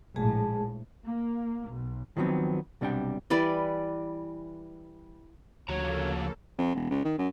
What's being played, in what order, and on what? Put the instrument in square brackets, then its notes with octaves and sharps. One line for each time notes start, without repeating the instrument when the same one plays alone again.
[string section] A#1 A2 [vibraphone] G#3 G#4 A5
[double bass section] A#3
B1
[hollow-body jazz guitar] D#3 F3 F#3 B3 C4
B1 C3 G3 D4 F#5 G5
[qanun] E3 G3 B4 D5
[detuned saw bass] D2 [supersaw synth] C#3 A#3 A4 [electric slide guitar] F3 F#4 A#5 [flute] C#5
[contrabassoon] F2
E1
C#2
D#3
F#2